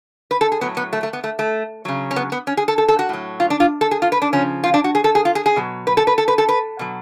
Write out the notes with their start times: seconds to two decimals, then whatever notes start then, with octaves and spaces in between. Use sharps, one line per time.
0.31 B4
0.41 A4
0.52 G#4
0.61 A2 F#3 B3
0.77 B3
0.93 A3
1.03 A3
1.13 B3
1.24 A3
1.39 A3
1.85 C#3 F#3
2.11 C#4
2.16 B3
2.32 B3
2.47 C#4
2.57 G#4
2.68 A4
2.78 A4
2.88 A4
2.99 F#4
3.09 A2 F#3
3.40 F4
3.50 D4
3.60 F4
3.81 A4
3.91 G#4
4.02 F4
4.12 B4
4.22 D4
4.33 C#3 F3 C#4
4.64 F4
4.74 D4
4.84 F#4
4.95 G#4
5.04 A4
5.15 G#4
5.25 F4
5.35 G#4
5.46 G#4
5.56 B2 F#3
5.87 B4
5.97 A4
6.07 B4
6.18 A4
6.28 B4
6.38 A4
6.49 B4
6.79 B2 F#3